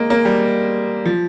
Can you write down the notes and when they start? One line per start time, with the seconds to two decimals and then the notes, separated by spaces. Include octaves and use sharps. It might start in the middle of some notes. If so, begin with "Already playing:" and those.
Already playing: G#3 A#3
0.10 A#3
0.25 G3
1.06 F3